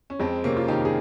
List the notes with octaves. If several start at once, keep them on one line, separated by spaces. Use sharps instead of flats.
C#4
F2 G#3 C4
C3 A#3 C#4
F4
D#3 D#4 G4
G#4